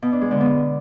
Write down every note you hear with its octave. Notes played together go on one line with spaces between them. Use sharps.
B2
D4
G#3
D3
B3